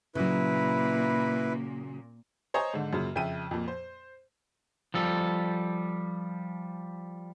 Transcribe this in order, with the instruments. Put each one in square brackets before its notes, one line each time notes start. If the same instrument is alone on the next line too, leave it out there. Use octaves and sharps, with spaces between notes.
[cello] A#2 A#3 [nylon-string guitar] C#3 F#3 [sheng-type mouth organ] E4 B4
[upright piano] C5 C#5 D#5 G#5 A#5
G#2 D3
F#2 A#2 C#3
F2 C#3 E5 G5 D#7
F2 A#2
C5
[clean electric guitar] F3 G3 A4